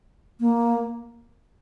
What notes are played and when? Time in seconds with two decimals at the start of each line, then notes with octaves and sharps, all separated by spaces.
0.40 A#3